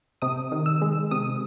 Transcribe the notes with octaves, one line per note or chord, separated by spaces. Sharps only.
C3 D#6
D#3
E6
G#3
C3 D#6